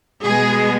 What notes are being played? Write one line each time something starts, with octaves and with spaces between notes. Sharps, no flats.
B2 G#3 B3 G#4